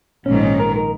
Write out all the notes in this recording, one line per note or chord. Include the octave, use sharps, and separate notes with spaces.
A#1 G#2 D#3 C#4
C#4
A#4
A#4